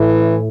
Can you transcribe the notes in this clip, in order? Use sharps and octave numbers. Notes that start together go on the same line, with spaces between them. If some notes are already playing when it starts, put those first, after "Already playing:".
Already playing: A2 E3